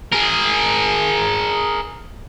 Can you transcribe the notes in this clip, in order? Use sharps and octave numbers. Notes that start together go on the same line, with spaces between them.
G#4 A#4